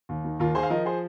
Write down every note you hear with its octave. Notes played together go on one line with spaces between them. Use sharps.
D#2
D#3
D#2 F4 A#4
D#3 G#4 C5
F5
F3 A#4 D#5
G#4 C5